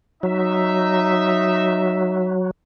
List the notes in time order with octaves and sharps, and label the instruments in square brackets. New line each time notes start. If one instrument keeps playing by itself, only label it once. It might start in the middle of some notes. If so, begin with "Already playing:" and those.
[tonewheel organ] F#3 [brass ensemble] D#4 E5